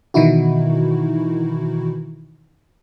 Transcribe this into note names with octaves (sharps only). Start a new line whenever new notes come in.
B2 D#3 E3 D#4 E4 F#4